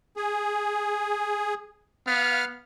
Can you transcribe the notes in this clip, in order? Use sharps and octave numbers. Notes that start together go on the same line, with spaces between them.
G#4
B3 F5 F6